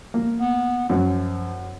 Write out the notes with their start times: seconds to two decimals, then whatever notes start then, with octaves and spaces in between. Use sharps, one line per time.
0.14 A#3
0.40 B3
0.89 F#2 F3